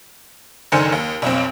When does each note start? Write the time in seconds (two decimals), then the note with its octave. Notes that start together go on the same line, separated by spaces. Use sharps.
0.72 F#1 D3 D#3 C5 G#5 C#7
0.92 D#2
1.22 B1 F2 C4